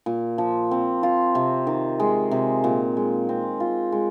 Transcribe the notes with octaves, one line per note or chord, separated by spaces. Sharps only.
A#2
F3
C4
F4
C3
D#3
G#3
C3
A#2
G#3
C4
F4
G#3